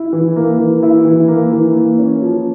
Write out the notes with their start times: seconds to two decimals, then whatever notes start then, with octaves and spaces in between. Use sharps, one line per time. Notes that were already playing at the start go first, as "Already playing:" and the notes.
Already playing: E4
0.13 E3
0.36 A#3
0.59 E3
0.83 E4
1.05 E3
1.28 A#3
1.52 E3
1.75 A#3
1.99 C#4
2.22 F3